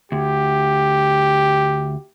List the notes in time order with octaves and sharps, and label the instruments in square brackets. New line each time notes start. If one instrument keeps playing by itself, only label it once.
[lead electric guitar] D2 [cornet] G4